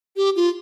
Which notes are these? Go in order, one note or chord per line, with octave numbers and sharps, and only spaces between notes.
G4
F4